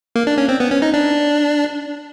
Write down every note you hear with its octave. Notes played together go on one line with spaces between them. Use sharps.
A#3
D4
C#4
C4
B3
C#4
D#4
D4